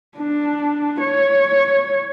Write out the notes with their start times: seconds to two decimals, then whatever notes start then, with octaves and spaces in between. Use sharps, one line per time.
0.18 D4
1.00 C#5